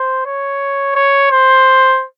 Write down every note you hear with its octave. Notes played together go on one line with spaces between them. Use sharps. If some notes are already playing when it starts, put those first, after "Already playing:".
Already playing: C5
C#5
C#5
C5